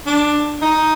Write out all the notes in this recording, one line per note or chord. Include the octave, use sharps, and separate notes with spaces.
D4
D#4